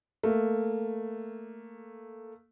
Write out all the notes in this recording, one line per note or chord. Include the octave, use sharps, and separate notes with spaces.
A3 A#3